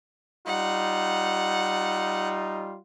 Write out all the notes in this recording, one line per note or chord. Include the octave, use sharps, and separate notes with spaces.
G3 D#4 F4 F#5